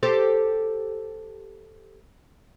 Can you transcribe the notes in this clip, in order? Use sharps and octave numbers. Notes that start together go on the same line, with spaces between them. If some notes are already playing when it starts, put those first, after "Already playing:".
G4 A4 C5